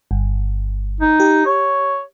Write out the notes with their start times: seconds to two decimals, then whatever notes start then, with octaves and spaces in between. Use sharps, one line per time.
0.11 G1
1.01 D#4
1.20 G4
1.46 C#5